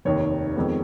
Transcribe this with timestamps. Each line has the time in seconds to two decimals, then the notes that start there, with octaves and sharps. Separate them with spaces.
0.05 F1 D#2 D#3 C#5
0.55 F2 D#3 G#3 B3